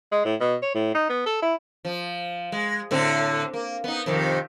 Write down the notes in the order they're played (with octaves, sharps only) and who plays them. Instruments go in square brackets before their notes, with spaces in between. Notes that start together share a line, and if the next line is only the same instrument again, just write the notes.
[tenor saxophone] G#3
A2
B2
C#5
A2
D#4
B3
A4
E4
[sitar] F3
G#3
A2 D3 C4
A#3
B3 D#4
F2 C3 D#3